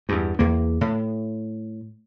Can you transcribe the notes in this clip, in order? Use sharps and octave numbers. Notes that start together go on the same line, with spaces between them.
E2 G2
E2 A#3
A2